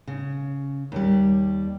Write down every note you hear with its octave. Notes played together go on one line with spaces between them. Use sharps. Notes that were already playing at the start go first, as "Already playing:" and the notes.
C#3
D#2 G3